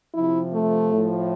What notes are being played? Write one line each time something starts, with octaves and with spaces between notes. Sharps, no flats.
C3 F3 E4
A3
A2 F3